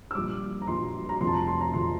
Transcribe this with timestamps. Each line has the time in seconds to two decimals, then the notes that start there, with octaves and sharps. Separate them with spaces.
0.11 E6
0.15 A#1 A#2 G3 D6
0.62 A#5
0.67 A#1 A#2 G3 C6
1.09 A#5
1.20 F1 F2 C3 F3 C6
1.27 A5
1.34 A#5
1.47 C6
1.61 A#5
1.73 F1 F2 C3 F3 C6